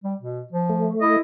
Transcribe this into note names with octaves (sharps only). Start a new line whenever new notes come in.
G3
B2
F3
A3
E4 D#5